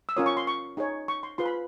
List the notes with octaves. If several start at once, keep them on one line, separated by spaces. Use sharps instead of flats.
E6
C#4 F4 A#4 C#5 D#6
C#6
C6
C#6
D#4 G#4 C#5
C#6
C6
F4 G#4 B4 C6
B5